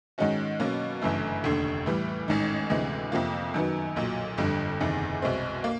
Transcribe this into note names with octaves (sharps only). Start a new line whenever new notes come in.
G#2 D#3 G#3 C#4 F#4
B2 F#3 A#3 C#4
G1 F#2 C#3 E3 A3
F1 D#2 D3
A2 E3 G3
A1 G#2 D#3
D2 C3 E3 G#3
F2 C3 F3 A#3
F#2 D#3 F#3 B3
B1 A#2 F#3
G1 F2 D3 G3
F#1 E2 C3 D#3
C2 B2 G#3 C4
A#3